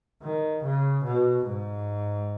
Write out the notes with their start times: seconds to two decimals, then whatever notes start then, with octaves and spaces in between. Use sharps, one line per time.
0.23 D#3
0.64 C#3
1.05 B2
1.46 G#2